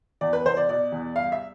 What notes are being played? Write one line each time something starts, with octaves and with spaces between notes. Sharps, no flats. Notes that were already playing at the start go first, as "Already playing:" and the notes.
E2 D5
B4
E2 C5
D5
B2 D5
E2
G2 F5
E5